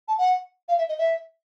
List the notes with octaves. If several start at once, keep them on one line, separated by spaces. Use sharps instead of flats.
A5
F#5
F5
E5
D#5
E5